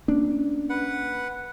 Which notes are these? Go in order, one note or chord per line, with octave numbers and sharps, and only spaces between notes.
A#3 C#4 D4
B4 F#5